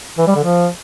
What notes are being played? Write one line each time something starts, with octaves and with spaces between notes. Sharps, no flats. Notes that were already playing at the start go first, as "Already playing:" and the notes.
E3
G3
D3
F3